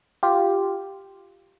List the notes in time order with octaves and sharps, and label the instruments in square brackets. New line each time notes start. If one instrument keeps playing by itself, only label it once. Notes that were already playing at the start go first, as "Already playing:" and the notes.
[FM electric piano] F4 G4